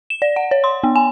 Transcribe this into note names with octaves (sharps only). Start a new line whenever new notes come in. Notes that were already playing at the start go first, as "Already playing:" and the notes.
E7
D5
F#5
C#5
C6
B3
G#5